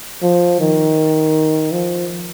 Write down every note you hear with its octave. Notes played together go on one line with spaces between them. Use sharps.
F3
D#3
F3